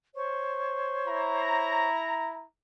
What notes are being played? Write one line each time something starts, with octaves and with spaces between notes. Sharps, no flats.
C5 C#5 C#6
E4 A#5